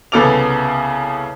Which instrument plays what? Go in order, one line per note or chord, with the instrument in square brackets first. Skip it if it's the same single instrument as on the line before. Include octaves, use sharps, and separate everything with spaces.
[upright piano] C2 C#3 B3 A4 D6 F7